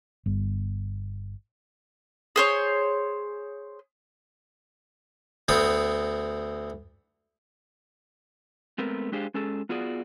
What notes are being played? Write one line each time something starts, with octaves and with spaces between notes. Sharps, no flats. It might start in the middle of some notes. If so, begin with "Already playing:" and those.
G1
G#4 C5 C#5
D2 B3 C4 D#6
G#3 A3 B3 C4 A#4
G#3 D4 G4 G#4 C5 F5
G#3 C#4 G#4 A4
B3 F4 F#4 G#4 D5